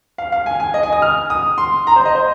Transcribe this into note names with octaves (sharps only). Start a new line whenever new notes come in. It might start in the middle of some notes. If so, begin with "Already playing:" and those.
F5
F5
G#5
G#5
D#5
G#5
D#6
F6
D#6
C6
A#5
C5
D#5
C5